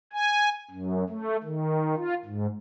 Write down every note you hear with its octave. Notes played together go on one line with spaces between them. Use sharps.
G#5
F#2
A3
D#3
F4
G#2